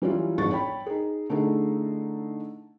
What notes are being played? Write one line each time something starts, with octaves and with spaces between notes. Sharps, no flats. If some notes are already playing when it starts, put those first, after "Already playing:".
E3 F#3 G3 C#4 E4 F4
G1 F2 G#2 G#4 C#6 A6
C#5 G5 B5
D#4 G#4
D3 A3 D#4 E4 G#4 A4